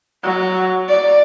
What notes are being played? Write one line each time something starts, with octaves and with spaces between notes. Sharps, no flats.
F#3
D5